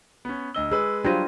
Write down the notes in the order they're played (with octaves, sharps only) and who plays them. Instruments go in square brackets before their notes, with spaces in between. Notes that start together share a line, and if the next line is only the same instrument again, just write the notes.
[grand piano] B3 C#4
[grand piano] D2 D#5 G7 [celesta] E6
[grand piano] G#3 B4 [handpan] G#4 [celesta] E6
[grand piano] F#3 [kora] G3 C5 [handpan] D4 F4 [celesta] G#6 A#6 D#7